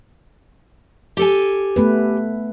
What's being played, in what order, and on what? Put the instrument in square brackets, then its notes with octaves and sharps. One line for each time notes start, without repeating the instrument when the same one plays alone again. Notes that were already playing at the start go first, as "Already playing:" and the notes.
[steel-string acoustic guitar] G4 A4 G#5
[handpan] A3 B3 B4